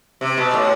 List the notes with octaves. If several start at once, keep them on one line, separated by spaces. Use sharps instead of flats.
C3
B2
A2